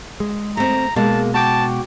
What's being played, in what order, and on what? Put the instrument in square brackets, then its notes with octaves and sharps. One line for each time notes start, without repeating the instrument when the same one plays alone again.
[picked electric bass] G#3
[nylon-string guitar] A3 C4 [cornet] A#5
[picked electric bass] B2 [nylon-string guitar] G#3 [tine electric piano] A#3 [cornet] A5
[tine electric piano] F#4 G5 D6 [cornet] A5